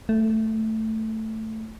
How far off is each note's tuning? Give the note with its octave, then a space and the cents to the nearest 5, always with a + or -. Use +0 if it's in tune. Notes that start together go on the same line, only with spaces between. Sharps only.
A3 +5